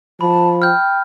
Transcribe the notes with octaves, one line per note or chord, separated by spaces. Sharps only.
F3 A5 B5
G5 F6 G6